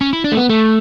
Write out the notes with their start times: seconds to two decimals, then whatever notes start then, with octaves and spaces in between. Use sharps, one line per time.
0.01 C#4
0.13 E4
0.24 D4
0.32 A3
0.37 B3
0.49 A3